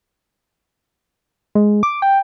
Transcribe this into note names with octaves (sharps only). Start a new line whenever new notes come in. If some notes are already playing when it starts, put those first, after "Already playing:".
G#3
D6
G5